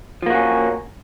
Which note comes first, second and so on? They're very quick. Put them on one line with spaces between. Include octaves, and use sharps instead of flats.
F3 A#3 F#4 C#4